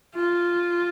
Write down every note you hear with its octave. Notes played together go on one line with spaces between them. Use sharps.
F4